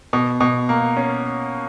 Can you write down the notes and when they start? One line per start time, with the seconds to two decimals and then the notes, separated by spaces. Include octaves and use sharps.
0.13 B2
0.40 B2
0.69 A#3
0.97 C#4